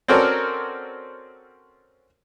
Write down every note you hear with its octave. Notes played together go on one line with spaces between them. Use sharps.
C4 C#4 F#4 A4 A#4 D5